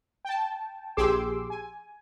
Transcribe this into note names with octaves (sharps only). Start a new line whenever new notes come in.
G5 A5
A#1 G4 G#4 C6 D6 E6
G#5